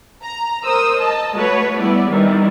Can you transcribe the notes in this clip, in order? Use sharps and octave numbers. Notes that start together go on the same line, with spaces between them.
A#5
A#4 C5 D#6 E6
D#5 A5
A3 F#4 B4 C#5
G3 B3 E4 D5
C3 D#3 E3 G3